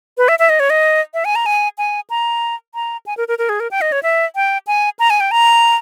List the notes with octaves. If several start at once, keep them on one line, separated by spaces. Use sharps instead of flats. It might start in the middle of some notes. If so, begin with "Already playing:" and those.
B4
E5
E5
D#5
C#5
D#5
E5
G#5
A#5
G#5
G#5
A#5
A#5
G#5
A#4
A#4
A#4
G#4
A#4
G5
D#5
C#5
E5
G5
G#5
A#5
G#5
G5
A#5